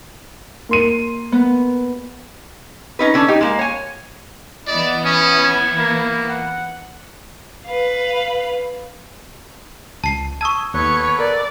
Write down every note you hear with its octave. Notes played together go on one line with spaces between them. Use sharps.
A#3 C6 D#7
B3
C#4 D#4 B4
D3 C#4 D4
D#4 G4
G#3 A#3 F5
C#5 G#5
E3 B3 E4 D5 D#5
C#4 D#6
G#6
A#3
F#5
B4 F5
C#2 A5 C7
A5 C#6 D#6 E6 G#6
D#2 B3 A4 B4 C#5
A#4 D5